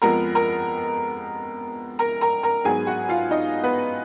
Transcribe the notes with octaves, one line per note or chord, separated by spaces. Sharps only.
F2 F3 G#3 B3 A#4 A#5
A#4 A#5
A#4 A#5
A#4 A#5
A#4 A#5
G#2 F#3 B3 G#4 G#5
F#4 F#5
F4 F5
D#4 D#5
B3 B4